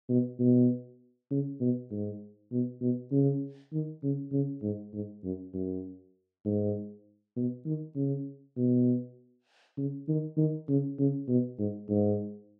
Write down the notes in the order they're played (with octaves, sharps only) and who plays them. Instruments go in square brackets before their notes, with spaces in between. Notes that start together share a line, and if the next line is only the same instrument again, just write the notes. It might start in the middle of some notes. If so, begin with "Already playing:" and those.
[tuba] B2
B2
C#3
B2
G#2
B2
B2
C#3
D#3
C#3
C#3
G#2
G#2
F#2
F#2
G#2
B2
D#3
C#3
B2
C#3
D#3
D#3
C#3
C#3
B2
G#2
G#2